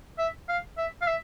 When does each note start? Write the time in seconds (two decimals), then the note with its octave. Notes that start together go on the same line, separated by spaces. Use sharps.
0.19 E5
0.49 F5
0.77 E5
1.02 F5
1.07 E5